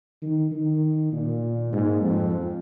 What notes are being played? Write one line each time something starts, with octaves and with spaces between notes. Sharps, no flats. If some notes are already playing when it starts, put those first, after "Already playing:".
D#3
D#3
A#2
G#2
F2